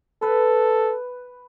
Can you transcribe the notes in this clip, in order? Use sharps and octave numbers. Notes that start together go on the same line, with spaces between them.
A4 B4